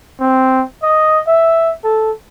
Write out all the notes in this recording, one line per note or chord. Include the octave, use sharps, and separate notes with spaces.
C4
D#5
E5
A4